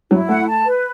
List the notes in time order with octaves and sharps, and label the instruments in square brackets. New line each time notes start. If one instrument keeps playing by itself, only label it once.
[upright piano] F#3 [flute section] E4
[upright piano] A3 [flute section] F#5
[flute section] A5
B4